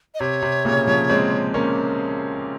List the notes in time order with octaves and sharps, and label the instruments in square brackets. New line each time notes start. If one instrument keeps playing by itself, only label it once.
[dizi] D#5
[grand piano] C3 [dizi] C#5
[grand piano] C3
A#2 C#3
C#3 F3
G#3 C4
A#3 C#4